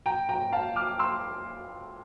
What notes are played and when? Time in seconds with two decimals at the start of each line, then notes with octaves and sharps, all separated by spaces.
0.06 G5 A#5
0.29 G5 A#5
0.52 F5 A5
0.76 D6 F6
0.99 C6 E6